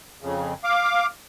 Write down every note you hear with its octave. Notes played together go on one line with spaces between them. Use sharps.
F2 C#3
F5 D6